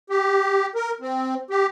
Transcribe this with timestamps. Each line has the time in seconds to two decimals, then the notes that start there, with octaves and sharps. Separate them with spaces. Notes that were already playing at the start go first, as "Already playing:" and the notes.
0.10 G4
0.76 A#4
1.01 C4
1.51 G4